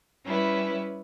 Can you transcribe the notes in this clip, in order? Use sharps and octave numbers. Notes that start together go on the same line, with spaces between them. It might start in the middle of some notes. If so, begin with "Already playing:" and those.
G3 C#4 E4 B4